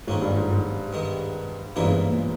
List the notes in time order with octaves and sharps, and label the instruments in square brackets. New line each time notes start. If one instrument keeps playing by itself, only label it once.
[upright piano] G#2 [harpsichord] D#3 A#3 C#4
[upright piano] G2
G#2
G#2
[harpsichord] G2 D#3 G#3
[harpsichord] E2 C#3 E3 A#3 D#4 [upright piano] G2
[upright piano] G#2
G2
A#2